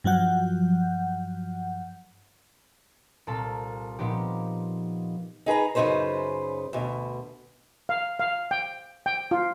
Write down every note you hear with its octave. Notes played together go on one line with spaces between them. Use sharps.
G2 F3 F#3 F#5 G6
C2 A#2 A4 A#4 A5
A#2 F3 B3 D#4 G4
D#4 G#4 B4 A#5
F#2 C#3 F3 D#4 B4 C5
D2 B2
F5
F5
G5
G5
F4